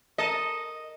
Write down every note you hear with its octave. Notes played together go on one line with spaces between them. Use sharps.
A4 A#4 D#5 A5